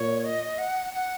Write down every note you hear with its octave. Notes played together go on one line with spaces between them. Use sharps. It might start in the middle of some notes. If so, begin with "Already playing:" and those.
Already playing: A#2 C#5
D#5
F#5
F#5